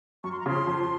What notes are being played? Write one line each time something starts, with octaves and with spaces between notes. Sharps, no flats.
F#2 C#6
C6
A#5
C#3 F3 C6
F2